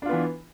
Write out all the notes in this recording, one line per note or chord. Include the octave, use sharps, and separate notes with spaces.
E3 B3 D4 F4